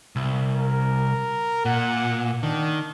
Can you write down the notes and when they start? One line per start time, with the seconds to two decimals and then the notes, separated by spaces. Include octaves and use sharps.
0.16 C2
0.56 A#4
1.65 A#2 F#5
2.43 D#3 D4